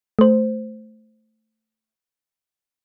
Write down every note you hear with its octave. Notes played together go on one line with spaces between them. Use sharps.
A3 C5